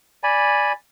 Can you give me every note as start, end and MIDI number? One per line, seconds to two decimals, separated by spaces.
0.23 0.72 74
0.23 0.72 80
0.23 0.72 83